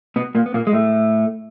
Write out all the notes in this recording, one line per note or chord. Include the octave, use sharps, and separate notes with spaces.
B2 B3
A#2 A#3
B3
A#2 A#3
G#3
A2 A3